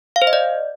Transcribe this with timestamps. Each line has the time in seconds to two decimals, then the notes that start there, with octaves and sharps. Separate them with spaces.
0.16 F5
0.22 C5
0.27 D#5
0.33 D5